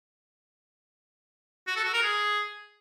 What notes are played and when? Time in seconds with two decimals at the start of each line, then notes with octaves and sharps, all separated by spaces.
1.67 F#4
1.76 A4
1.85 F#4
1.94 A#4
2.03 G#4